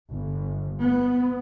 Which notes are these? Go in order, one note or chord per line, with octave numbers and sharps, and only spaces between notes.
G1
B3